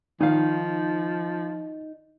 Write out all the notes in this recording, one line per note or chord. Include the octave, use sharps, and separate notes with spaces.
D#3 F3 D#4 F5